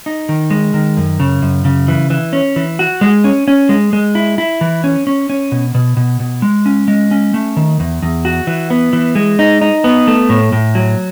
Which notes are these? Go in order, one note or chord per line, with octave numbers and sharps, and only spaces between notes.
D#4
D#3
G#3
D#3
F#2
C#3
F#2
C#3
E3
E3
C#4
E3
F#4
G#3
C#4
C#4
G#3
G#3
E4
E4
E3
C#4
C#4
C#4
B2
B2
B2
B2
G#3
C#4
G#3
C#4
A3
D#3
E2
E2
F#4
E3
B3
E3
G#3
D#4
D#4
B3
A3
A2
A2
F#3